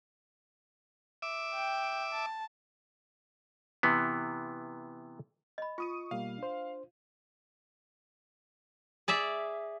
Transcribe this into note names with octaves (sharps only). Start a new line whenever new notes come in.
E5 D6
G5
A5
C3 E3 B3
D#5 B5
F4 C#6 D#6 D#7
B2 G3 A#3 F5
D4 C5
G#4 D5 E5